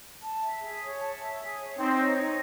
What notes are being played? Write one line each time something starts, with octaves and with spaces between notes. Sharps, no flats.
A5
E5
G#4
C#5
A5
E5
G#4
C#5
C4 D#4
C#5
D#4